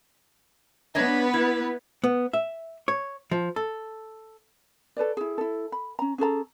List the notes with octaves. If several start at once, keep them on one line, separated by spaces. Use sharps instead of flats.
B3 D4 B4 C#5 D#5
E4
B3
E5
C#5
F3
A4
A4 B4 C#5 D5
E4 G#4
E4 A4
B5
C#4 A#5
C#4 G#4 A4 A#5